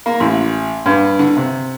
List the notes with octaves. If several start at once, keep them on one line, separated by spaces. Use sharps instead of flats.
A#3
A1
G2
D3
C3